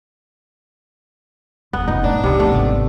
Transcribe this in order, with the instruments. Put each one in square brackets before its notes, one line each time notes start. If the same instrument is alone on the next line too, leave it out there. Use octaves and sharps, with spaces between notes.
[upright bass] E1 A1 [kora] B3
[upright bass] F1 A#2 [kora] D#4
[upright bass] A2 [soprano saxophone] D4
[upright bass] C#2 A2 [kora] C3 B3
[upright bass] F2 C3 [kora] A3
[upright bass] G#1 B2